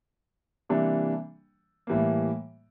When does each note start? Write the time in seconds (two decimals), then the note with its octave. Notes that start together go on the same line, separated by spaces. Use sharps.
0.69 C3 E3 G3 A#3 D4
1.87 A2 E3 G3 A#3